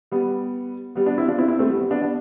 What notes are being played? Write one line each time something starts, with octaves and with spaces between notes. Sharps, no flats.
G3 B3
G3 B3
B3 D4
C4 E4
D4 F4
C4 E4
C4 E4
A3 C4
G3 B3
G3 B3
B3 D4
B3 D4